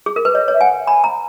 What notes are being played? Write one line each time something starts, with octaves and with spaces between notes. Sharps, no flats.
G#4
A#4
B4
C#5 D#5
C#5
E5
F#5 G#5
G#5 B5
A#5